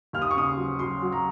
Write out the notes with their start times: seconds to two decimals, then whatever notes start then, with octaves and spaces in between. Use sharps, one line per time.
0.13 D#2 F6
0.22 D#6
0.31 C#6
0.36 C#3 D#6
0.46 C6
0.57 F#3
0.79 F#3 C6
1.02 F#3
1.12 A#5